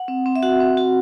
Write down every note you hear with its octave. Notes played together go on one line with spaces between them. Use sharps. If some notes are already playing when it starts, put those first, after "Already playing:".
Already playing: F#5
C4
C4
E5
F#4 F#5
C4
F#4